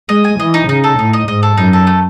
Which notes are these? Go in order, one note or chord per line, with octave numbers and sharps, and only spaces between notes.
G#3 D#5
G#5
E3 D#5
D#4
C#3 D#4
A4
A2 D#4
D#5
G#2 D#5
A4
F#2 D#4
A4
A3